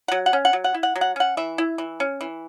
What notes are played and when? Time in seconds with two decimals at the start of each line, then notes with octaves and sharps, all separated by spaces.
0.08 F#3 F#5
0.26 F#5
0.33 C#4
0.45 F#5
0.53 F#3
0.64 F#5
0.74 E4
0.83 F#5
0.96 F#3
1.01 F#5
1.16 C#4 F#5
1.37 E3 E5
1.58 E4
1.78 E3
2.00 C#4
2.21 E3